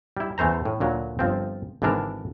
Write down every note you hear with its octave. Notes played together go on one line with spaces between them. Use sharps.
G3 E4
E2 E3 A3 C5 A#5
A2
D2 A#2 F#3
G1 F3 C4
G#1 D3 E3 D4 A#4